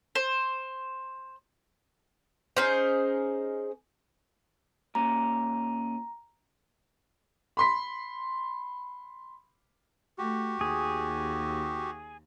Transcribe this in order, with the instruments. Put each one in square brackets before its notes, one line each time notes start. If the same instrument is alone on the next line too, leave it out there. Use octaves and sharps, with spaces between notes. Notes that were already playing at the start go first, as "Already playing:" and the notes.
[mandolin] C5
[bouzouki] C#4 D#4 G#4 C5
[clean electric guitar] A#2 C#4 [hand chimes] A#5
[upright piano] B5 C6 B6
[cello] A3 [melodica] F#4 G4
[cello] D#2 [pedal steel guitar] G#4